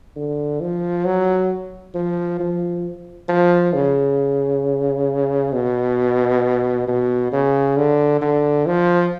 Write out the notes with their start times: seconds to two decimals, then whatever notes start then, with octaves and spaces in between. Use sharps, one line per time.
0.16 D3
0.61 F3
1.05 F#3
1.95 F3
2.40 F3
3.29 F3
3.74 C#3
5.53 B2
6.88 B2
7.32 C#3
7.77 D3
8.22 D3
8.66 F3